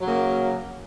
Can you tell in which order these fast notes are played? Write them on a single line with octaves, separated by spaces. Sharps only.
F#3 C#3 A#3